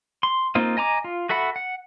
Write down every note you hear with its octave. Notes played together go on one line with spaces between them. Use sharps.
C6
A#3 C4 D#4 F4
D#5 G#5 A#5 D6
F4
F#4 A4 E5 F#5 B5
F#5